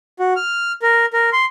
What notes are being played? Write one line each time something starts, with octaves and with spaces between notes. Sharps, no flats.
F#4
F6
A#4
A#4
C6